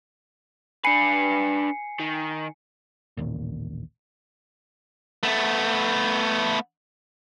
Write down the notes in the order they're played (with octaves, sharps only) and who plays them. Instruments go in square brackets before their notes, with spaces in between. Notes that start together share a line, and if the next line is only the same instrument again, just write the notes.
[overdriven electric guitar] D4 B4 [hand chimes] G#5 C7 C#7
[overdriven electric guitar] D#3
[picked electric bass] A1 D#2 A#2
[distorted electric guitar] A3 B3